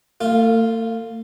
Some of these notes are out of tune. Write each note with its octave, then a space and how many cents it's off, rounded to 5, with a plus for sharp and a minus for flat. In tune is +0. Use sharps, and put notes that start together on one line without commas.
A3 +45 F4 +0